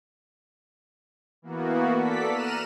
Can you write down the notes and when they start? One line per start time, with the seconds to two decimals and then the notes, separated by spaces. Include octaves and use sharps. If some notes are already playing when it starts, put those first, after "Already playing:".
1.42 E3 A#3 B3 F#4
1.98 A4 D5 B6
2.30 A#5 F6 F#6 D#7 E7